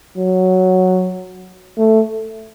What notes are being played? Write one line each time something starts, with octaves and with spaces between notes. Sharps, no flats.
F#3
A3